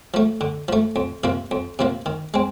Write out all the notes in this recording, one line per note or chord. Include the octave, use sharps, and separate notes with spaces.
F3 A3
D3
F3 A3
F2
C3 F3 A#3
F2
C3 F3 A#3
D#3
G#3 C4